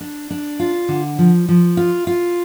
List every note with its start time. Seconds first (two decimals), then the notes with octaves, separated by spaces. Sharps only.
0.01 D4
0.30 D4
0.60 F4
0.88 D3
1.19 F3
1.49 F3
1.77 F4
2.07 F4